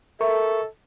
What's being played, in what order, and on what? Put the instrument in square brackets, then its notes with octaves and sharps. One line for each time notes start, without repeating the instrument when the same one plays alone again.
[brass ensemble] A4 [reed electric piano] A#4 C#6 [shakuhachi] E5